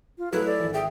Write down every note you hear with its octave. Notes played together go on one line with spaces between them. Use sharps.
F4
F#3 A3 E4 G#4 A4 B4
A4 D5
G#1 E3
G#4 E5 G5